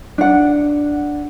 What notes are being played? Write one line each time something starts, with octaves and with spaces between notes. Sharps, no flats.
D4 F#5